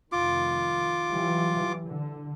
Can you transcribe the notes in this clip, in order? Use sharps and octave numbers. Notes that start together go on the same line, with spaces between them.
F1 D#3 F4 D6
E3 F#3 G3
D3